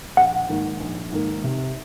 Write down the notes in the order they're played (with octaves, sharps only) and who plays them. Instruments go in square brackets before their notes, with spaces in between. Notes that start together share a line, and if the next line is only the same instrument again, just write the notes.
[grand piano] A#1 [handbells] F#5
[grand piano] G#2 D#3 A#3
A#1
G#2 D#3 A#3
C3